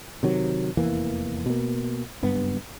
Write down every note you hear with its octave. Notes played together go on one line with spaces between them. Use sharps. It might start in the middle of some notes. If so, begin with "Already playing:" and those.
C3 D#3 F#3
F1 E2 E3 A#3
B2 A#3
F#1 G2 B3